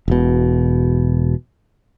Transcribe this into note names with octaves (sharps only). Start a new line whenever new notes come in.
E1 B2